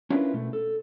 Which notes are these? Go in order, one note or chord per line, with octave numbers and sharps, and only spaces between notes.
C#4 D4 E4 F4 A#4 B4
B2 A3
A4